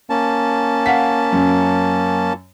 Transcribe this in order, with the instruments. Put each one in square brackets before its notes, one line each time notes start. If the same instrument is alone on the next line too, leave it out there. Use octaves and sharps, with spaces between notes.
[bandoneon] A#3 C#4 A5
[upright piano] F5 F#5 B6
F#2